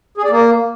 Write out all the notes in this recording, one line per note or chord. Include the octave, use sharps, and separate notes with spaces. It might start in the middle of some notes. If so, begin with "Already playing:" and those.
G#4
D5
A#3